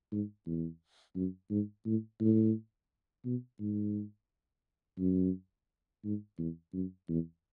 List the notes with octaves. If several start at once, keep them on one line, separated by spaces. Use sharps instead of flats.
G#2
E2
F#2
G#2
A2
A2
B2
G#2
F#2
G#2
E2
F#2
E2